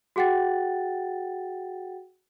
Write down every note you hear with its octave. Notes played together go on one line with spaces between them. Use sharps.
F#4 G#4 F#5 G5 A6